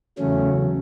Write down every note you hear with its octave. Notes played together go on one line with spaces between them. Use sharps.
E2 C#3 F#3 A3 C#4